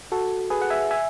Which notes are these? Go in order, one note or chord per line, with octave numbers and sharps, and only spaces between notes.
F#4 A4
G#4 B4
F#5
E5 G#5
E5 G#5